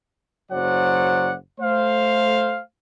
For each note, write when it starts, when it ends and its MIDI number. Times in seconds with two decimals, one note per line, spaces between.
0.51 1.35 30
0.51 1.35 54
0.51 1.35 72
0.51 1.35 74
0.51 1.35 78
1.61 2.60 57
1.61 2.60 72
1.61 2.60 77